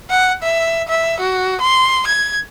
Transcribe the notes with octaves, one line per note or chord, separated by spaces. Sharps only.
F#5
E5
E5
F#4
C6
G#6